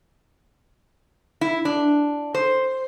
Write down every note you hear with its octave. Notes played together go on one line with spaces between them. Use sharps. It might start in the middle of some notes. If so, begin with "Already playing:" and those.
E4
D4
C5